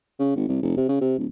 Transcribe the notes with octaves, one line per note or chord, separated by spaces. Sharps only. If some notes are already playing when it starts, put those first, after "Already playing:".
C#3
G#1
C2
F1
C3
C#3
C3
D1